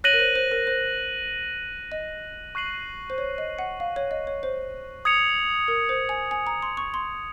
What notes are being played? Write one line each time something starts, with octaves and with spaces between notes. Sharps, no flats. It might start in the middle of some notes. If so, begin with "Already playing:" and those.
C#5 F#6 A#6 D#7 F#7
A#4
C5
C5
A#4
C5
D#5
C#6 F#6 C7 D#7 F#7
C5
C#5
D#5
F#5
F5
C#5
D#5
C#5
C5
D#6 G#6 C#7 F7
A#4
C5
G#5
G#5
A#5
C6
C#6
C6